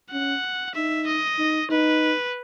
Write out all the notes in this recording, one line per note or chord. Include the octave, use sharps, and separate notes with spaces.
C#4 F#5
D#4 E5
D#5
D#4
D#4 B4